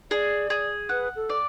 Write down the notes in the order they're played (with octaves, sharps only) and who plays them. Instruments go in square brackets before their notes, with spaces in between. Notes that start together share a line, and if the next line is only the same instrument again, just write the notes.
[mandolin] G#4 [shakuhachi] D5
[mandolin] G#4
[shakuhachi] B4 [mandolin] F#5
[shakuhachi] A4
[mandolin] D5